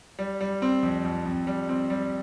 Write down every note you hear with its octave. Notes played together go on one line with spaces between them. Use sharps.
G3
G3
C4
F2
F2
F2
G3
C4
G3